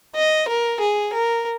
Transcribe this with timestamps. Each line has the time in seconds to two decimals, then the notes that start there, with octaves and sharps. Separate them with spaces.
0.15 D#5
0.48 A#4
0.80 G#4
1.13 A#4